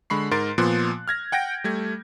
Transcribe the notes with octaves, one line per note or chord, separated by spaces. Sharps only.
D3 G#3 B5 C#6 C7
G#2 A#4 C6 A6 D7
A#2 F3 B3 C6 F#6
F6 G#6 A#6
F#5 G5 G6 A#6 D7
G3 A3 G#6